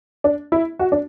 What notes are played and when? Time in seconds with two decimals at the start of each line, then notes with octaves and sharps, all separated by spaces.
0.24 D4
0.52 E4
0.79 F#4
0.92 D4